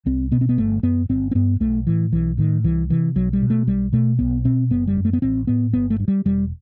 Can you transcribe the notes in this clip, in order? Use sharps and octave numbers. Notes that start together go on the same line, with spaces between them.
C2 C4
B2 B3
C4
B3
G1 A3
F#2 B3
G1 C4
C4
G2 B3
B1 A3
A2 E3
B1 E3
A2 D#3
C2 E3
C3 E3
B1 F#3
G3
B2
A3
B1 G3
B2 A3
B1 B3
B2 C4
F#1 B3
G3
F#2
A3
B3
A1 C4
A2 B3
G1 B3
A3
G2
G3
E1 G3